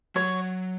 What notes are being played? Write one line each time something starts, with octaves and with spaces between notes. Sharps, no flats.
F#3 C#5